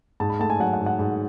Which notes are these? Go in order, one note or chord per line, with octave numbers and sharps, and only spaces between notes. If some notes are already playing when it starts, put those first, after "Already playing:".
G#2 A5
B5
A3 A5
G#5
F#3 F#5
F#5
G#2
F#5
G#2